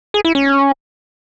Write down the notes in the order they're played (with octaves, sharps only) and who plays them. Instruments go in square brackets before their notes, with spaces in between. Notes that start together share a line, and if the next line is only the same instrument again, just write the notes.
[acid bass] G#4
E4
C#4